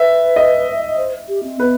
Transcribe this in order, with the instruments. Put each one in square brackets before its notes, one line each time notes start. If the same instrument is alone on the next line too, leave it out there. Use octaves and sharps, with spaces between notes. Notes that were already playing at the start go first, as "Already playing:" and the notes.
Already playing: [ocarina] B4 [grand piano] E5
[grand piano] D#5
[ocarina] E5
D#5
C5
G4
C4
[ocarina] B3 [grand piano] B4